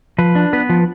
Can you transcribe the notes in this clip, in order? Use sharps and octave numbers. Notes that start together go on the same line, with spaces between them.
F3 B4
D4
B3 B4
F3